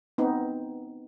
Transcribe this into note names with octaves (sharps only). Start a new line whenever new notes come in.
B3 C4 D#4